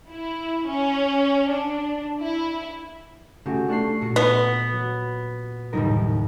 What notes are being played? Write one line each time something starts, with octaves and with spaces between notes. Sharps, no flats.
E4
C#4
D4
E4
C#3 A3 F#4 G4
A3 D4 A4 C#6 C7
A#2 F#4 C#7
B3
F#3
F#1 D#2 A2 G3 D#4 A#4